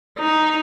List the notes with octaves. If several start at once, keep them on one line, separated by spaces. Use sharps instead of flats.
D#4